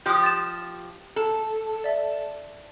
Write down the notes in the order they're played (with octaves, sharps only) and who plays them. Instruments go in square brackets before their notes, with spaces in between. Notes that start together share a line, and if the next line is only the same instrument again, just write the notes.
[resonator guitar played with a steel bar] F3 G4 [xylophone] D#6 F#6 G6
[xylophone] A6 E7
[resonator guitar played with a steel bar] A4
[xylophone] D5 E5